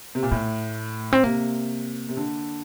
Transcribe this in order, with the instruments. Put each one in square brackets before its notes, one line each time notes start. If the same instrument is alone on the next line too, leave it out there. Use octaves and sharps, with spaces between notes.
[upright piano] C3
A#2
[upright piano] A2 [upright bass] A3
[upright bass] C4
[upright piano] C3 [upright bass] A#3
[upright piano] C3
D3